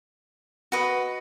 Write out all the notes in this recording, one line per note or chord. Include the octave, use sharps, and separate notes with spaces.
F#4 B4 D#5